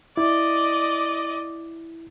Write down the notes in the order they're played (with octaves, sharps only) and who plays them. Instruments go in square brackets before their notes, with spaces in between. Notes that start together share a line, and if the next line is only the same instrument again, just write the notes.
[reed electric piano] E4 [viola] D5 D#5